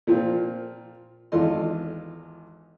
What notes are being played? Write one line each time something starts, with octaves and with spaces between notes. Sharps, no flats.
A#2 F3 A#3 C4 F4
G#1 E2 F4 A4 D#5 C6